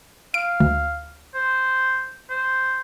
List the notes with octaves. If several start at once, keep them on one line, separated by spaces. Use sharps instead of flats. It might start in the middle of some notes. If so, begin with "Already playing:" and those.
F5 D7
D2
C5
C5